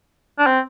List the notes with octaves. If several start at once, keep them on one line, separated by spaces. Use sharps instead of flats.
D4
C4